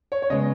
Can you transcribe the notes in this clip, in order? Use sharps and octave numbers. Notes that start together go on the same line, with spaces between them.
C#5
C#5
C#3 G#3 B3 D#5